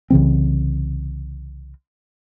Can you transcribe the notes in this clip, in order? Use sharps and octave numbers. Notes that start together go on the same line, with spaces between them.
C2 C#3 E3 C4